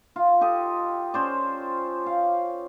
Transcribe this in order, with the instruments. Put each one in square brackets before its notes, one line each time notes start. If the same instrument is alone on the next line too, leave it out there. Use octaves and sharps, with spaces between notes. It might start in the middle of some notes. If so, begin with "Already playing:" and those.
[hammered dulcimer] F4
G4 A4 D#5
C#4 C5 D5
F5